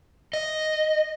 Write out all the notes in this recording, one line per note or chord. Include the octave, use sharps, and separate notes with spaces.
D#5